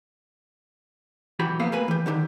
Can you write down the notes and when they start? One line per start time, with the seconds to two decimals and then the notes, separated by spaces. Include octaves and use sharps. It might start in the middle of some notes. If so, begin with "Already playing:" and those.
1.39 B1 E3 F#4 G4 B5
1.59 F3 A#3 B3 A4 F5
1.72 A3 A#3 B4 G#5
1.88 E3 G4
2.06 D3 D#3 G4